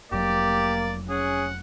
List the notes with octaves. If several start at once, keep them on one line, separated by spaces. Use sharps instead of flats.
F1 F#3 A#3 G4 D5
C#4 G#4 F#5